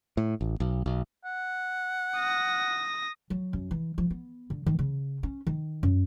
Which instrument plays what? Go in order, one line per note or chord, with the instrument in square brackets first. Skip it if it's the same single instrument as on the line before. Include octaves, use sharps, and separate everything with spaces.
[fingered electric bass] A2
A1
B1
B1
[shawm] F#5
[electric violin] D#6 A#6
[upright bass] F#3
F#2
E3
F3
B3
D3
D#3
C#3
C#4
D#3
F#2